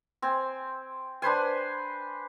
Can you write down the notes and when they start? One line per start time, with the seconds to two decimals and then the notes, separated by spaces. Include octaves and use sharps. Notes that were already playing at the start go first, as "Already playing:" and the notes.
0.22 C4 G#5
1.22 D4 B4 C5 G#5